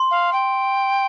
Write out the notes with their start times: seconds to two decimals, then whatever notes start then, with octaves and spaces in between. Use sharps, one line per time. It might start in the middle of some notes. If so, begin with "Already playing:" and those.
Already playing: C6
0.11 F5
0.33 G5